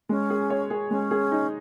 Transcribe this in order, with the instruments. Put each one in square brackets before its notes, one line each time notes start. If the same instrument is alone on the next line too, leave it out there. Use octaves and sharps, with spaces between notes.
[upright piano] G#3 [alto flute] C#4
[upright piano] G#4
C#5
G#4
[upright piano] G#3 [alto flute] C#4
[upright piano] G#4
D#4